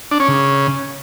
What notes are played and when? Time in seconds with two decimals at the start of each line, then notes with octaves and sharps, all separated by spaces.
0.11 D4
0.20 C#4
0.28 C#3